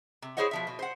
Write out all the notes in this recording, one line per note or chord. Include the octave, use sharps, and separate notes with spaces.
C3
E4 G#4 C5 C#5 D#5 F#5
B2 F3 E5
B2
C5 F#5